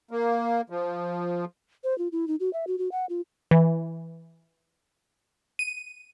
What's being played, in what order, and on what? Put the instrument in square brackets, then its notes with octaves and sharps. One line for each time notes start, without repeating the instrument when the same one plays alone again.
[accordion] A#3
F3
[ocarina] C5
F4
E4
D#4
F#4
E5
F#4
F#4
F#5
F4
[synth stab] E3
D#7